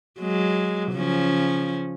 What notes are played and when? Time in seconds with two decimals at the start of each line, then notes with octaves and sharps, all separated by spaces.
0.20 F#3 G#3
0.93 C#3 F3 C#4